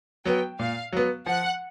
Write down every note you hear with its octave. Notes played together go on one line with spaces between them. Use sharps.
F#3 B3 G5
A#2 F5
F#3 B3
F3 F#5